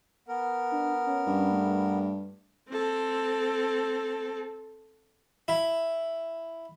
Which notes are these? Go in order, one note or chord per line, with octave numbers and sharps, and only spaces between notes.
B3 A#4
D4
C#4
G2
A3
C4 A4
E4